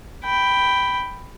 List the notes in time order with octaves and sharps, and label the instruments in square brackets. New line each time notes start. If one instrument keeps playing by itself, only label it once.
[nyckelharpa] G5 B5